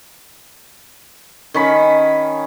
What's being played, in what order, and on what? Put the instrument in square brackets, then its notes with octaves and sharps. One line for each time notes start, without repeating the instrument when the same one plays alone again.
[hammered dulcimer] D#3 C#4 B5